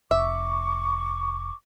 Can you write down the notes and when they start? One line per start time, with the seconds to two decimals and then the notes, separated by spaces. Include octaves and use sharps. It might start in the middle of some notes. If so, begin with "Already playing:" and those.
0.11 F1 E5 C#6 D6